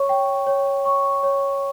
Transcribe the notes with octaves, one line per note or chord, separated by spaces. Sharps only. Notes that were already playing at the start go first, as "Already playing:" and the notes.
Already playing: C#5 C#6
G5
C#5
C#6
C#5